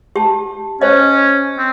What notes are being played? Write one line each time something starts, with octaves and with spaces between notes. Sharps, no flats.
G4 A5
C#4 C5 C#5 D#5
C4